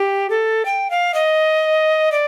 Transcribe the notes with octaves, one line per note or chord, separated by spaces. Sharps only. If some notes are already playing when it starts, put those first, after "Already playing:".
Already playing: G4
A4
G5
F5
D#5
D5